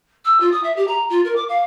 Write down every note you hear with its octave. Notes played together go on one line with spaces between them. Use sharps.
E6
F4
D#6
E5
G4
A#5
F4
A#4
D6
F5